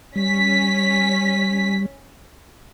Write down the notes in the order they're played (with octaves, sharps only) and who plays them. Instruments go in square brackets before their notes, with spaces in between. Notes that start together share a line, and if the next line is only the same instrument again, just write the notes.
[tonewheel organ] G3 [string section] C#4 B6